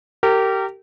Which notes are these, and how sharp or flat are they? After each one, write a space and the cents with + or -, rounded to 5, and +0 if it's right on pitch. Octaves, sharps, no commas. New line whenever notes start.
G4 -20 A#4 -30